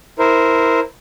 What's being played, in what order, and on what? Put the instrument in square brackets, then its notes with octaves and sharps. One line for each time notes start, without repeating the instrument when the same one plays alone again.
[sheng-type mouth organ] E4 A#4 C5